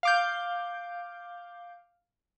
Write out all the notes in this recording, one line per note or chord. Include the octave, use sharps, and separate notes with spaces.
F5 D6 G6